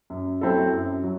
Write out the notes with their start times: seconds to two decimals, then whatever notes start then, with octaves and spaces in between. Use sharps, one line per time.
0.10 F#2
0.41 F#3 C4 E4 A4
0.73 F#2
1.04 F#3